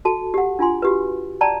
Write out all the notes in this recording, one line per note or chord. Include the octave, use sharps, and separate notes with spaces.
F#4 A4 A5
G4 A4 F#5
D4 F4 G#5 C6
F#4 G4 B4
D5 G5 A5 A#5